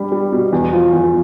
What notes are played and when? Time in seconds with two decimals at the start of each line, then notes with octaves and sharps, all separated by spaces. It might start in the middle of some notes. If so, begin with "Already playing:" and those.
Already playing: G3 D4 B5
0.12 G3
0.32 B2
0.52 E2
0.73 F3
0.93 E2